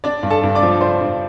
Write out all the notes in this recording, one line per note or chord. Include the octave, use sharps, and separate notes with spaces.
D4 D5
G2
A4 A5
G2
D5 D6
F3
D4 C5 C6
G2